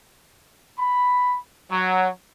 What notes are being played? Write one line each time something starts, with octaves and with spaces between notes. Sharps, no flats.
B5
F#3